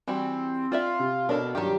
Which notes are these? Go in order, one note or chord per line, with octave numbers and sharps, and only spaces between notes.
E3 G3 C4 F#4
C4 F4 D5 E5
C3
B2 D4 A4 A#4 C#5
G2 D#3 F#3 F4 G4